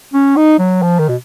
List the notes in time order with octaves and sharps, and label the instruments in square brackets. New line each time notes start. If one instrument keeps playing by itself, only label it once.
[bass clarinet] C#4
D#4
F#3
F3
D#3
B2